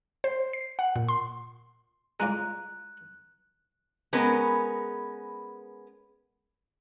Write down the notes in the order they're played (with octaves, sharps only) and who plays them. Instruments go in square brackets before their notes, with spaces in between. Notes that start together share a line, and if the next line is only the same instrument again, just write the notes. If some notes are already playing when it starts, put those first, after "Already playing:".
[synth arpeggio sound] C5
C7
F#5
A#2
C6
[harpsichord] G#3 F4 D5 [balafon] A#5 [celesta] F#6
[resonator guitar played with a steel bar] G#3 B3 C#4 A#4 B4